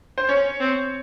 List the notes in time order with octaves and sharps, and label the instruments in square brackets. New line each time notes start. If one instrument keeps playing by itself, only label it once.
[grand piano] C5
[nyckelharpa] C#4 [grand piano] C#5
[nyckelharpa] C4